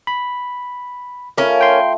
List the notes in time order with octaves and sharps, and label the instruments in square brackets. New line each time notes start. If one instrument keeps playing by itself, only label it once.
[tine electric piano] B5
[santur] A3 F4 B5 [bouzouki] C#4 A#4
[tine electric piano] G5 C6